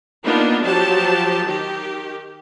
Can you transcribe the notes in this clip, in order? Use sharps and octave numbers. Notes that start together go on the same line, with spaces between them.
A#3 B3 D4 D#4 F4
F3 F#3 G4 A5
D#3 G4